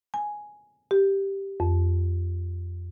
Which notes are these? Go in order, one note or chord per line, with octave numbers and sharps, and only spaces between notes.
G#5
G4
F2